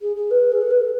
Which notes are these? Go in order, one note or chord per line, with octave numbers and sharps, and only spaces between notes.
G#4
G#4
B4
G#4
A4
B4
A4